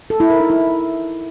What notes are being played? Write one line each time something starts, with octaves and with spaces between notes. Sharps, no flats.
A4
E4
A#4
D#4
E4